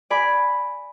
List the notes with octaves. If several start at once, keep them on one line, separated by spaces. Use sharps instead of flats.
D5 G#5 B5